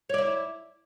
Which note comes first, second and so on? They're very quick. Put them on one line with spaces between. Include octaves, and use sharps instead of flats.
C#5 D5 E4